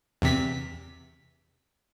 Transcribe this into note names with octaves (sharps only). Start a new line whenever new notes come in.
E2 C3 B6